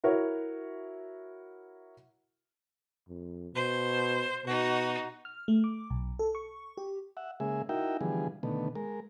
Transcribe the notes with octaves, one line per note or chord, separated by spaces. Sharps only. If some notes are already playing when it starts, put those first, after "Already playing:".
E4 F#4 A#4 C#5
F2
B2 C5
B2 D#4 F#4
F6
A3
D6
B1
A4
C#6
G4
E5 F#5
C#3 G#3 A#3 G#4 E5
D#4 E4 F#4 A#4 E5 G5
D3 E3 F3 G3 B3 G#4
B2 D3 D#3 A3 B3
G#3 A#4